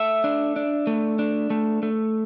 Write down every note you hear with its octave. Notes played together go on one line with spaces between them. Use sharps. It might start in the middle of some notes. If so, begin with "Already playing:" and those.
Already playing: A3 E5
D4
D4
A3
D4
A3
A3